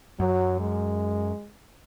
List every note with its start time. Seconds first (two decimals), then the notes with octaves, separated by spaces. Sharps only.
0.20 F#2 F#3
0.60 G#3